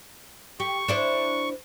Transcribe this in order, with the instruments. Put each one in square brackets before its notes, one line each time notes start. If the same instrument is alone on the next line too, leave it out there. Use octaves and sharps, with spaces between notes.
[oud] G4 [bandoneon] C#6
[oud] D4 E4 C5